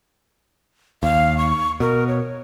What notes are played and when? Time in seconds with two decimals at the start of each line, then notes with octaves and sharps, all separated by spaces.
1.03 D#2 F5
1.37 C#6
1.80 B2 A#4
2.07 C#5